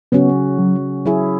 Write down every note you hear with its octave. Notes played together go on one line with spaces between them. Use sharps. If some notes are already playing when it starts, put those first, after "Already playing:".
C#3 F#3 B3 C#4 F#4
F#3
F#3 E4 G#4